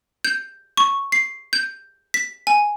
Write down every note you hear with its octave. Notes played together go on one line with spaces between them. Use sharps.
G6
C#6
C7
G6
B6
G#5